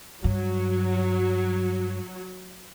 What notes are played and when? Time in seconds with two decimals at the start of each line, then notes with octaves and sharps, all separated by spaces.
0.24 G2 F#3